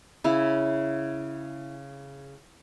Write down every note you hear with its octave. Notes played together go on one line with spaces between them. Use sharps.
C#3 E4